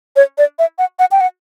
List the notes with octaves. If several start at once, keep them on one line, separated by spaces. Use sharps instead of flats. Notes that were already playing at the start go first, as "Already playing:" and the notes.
C#5
D5
E5
F#5
F#5
G5
F#5